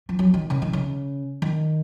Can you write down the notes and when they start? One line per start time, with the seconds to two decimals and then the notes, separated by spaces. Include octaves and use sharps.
0.09 F3
0.19 F#3
0.34 D#3
0.50 C#3
0.62 D#3
0.73 C#3
1.42 D#3